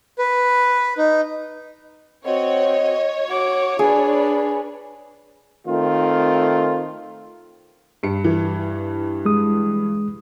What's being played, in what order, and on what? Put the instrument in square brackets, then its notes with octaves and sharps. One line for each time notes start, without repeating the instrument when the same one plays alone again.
[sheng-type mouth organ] B4
D#4
[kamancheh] C4 F#4 [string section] C#5 [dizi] D#5
[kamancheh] F#4 D6
[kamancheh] D4 B4 [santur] G#4 [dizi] D5
[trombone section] D#3 A3 C4 F4
[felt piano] G2 C#7
[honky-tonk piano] E3
[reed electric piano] G#3 D#6